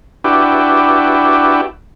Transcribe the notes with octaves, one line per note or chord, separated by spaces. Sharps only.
D4 E4 F#4 G4 B4